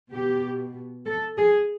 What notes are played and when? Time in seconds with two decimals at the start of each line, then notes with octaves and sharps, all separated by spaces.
0.13 B2 G4
1.06 A4
1.37 G#4